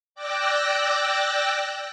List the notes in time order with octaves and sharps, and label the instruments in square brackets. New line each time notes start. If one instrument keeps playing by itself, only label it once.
[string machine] D5 G5 D6 E6 F#6 A#6